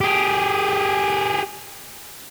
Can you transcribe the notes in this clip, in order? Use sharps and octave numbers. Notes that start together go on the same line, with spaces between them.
G4 G#4